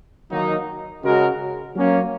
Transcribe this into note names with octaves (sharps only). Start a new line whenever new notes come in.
D#3 F#3 A#3 D#4
C#3 G#3 F#4 A#4
F#3 A#3 C#4